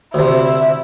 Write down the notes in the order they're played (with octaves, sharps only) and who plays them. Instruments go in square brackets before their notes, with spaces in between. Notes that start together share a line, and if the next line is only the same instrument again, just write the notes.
[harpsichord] D2 C3 [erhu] E4